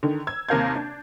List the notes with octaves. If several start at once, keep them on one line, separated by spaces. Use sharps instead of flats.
D3 D#3
E6 G#6
D#2 C3 A#4 F5 G6 G#6
D4